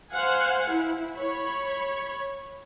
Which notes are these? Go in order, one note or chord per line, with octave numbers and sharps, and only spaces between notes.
C5 F5 F#5 G#5
E4
C#5 B5